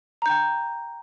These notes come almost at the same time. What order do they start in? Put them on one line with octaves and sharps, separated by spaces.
A#5 G6 G5